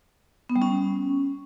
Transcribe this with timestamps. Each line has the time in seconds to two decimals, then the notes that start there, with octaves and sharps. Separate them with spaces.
0.50 B3
0.56 G3
0.62 C#4